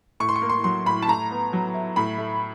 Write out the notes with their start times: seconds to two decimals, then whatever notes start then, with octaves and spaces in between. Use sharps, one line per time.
0.20 A2 C#6
0.29 C6
0.36 C#6
0.42 A#3
0.49 C6
0.64 F#3 C6
0.86 A2 B5
1.02 A5
1.08 A2 A#5
1.31 B3
1.53 F#3
1.74 E4
1.96 A2 B5
2.18 A3